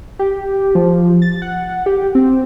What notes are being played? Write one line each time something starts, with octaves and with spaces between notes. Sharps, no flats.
G4
F3
A6
F#5
G4
C4